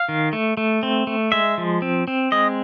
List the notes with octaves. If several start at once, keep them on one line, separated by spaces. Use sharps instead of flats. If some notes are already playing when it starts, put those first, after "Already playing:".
Already playing: F5
D#3
A3
A3
C4
A3
G#3 E5
F3
C4
C4
G#3 D#5